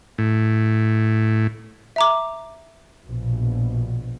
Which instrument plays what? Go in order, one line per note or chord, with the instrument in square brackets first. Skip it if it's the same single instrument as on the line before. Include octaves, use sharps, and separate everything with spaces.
[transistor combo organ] A2
[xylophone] E5 A#5 D6
[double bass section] A#1 B2